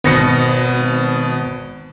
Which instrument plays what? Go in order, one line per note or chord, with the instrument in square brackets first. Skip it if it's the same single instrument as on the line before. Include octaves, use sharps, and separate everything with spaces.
[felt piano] G#1 A#6 C#7 [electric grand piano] B2 B3